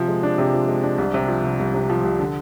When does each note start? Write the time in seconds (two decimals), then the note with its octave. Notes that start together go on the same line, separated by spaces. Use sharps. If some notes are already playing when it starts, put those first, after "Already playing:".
Already playing: C3 F3
0.08 G#3
0.23 D4
0.38 C3
0.54 F3
0.68 G#3
0.83 D4
0.98 C2
1.14 C3
1.28 F3
1.44 C2
1.59 C2
1.74 C3
1.90 F3
2.04 C2
2.19 D3